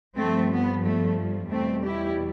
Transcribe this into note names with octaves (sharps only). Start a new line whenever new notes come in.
G2 F3 A3 C4
B3
A3
E2 B2 G3 A3 C4
E4 G4